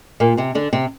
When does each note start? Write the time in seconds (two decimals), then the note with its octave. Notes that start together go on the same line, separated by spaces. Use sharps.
0.20 A#2 A#3
0.37 C3 C4
0.55 D3 D4
0.73 C3 C4